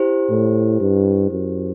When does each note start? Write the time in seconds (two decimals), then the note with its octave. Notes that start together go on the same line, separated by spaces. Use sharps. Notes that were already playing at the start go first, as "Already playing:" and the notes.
Already playing: E4 G4 C5
0.30 A2
0.80 G2
1.31 F#2